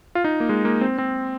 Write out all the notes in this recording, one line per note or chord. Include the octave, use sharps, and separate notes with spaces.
F4
D#4
A#3
G#3
A#3
C4
C4